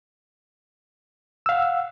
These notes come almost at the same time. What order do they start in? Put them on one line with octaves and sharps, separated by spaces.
E6 F5 F#5